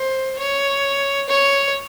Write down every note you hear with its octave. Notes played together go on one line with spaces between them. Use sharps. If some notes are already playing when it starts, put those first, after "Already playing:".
Already playing: C5
C#5
C#5